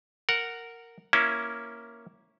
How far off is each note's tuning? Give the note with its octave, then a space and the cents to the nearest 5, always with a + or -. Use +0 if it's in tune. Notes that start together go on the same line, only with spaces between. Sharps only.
A#4 -10 F#5 +0
A#3 +5 C#4 +0 E4 +0